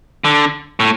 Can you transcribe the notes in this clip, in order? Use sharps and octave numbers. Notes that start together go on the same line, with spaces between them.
D3
A2